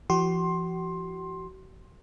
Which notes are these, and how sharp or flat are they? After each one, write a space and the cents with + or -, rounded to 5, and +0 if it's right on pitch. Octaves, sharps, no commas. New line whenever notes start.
F3 -40 F#4 +45 C6 +15